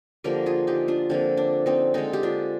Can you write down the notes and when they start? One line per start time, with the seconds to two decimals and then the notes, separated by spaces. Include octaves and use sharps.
0.24 D3 F3 A#3 G4 A#4
0.46 F4 G#4
0.67 D#4 G4
0.88 D4 F4
1.10 D3 F3 A#3 C4
1.37 D4
1.66 C4 D#4
1.94 D3 G#3 C4 D#4
2.13 G4
2.23 D4 F4